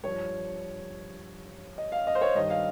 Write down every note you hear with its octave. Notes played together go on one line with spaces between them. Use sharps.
G2 F3 C#5
D#5
F5
D#5
C5
C#5
G2 D#3 D#5
F5